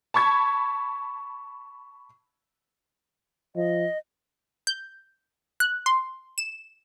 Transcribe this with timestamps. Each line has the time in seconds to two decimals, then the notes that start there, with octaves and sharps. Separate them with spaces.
0.14 A5 B5 C#6 G#6
3.56 F3 D#5
4.67 G6
5.60 F#6
5.86 C6
6.38 E7